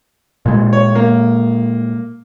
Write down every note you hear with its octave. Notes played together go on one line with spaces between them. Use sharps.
A#2 G#3
C#5
A#3